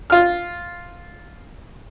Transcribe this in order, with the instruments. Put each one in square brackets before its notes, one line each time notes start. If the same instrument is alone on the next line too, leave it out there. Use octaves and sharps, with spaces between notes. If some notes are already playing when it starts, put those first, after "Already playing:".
[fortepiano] F4 F6